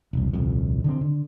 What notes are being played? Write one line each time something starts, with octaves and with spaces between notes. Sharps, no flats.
E1 C2
D#1 C2 F2
D3 D#3 C4
D3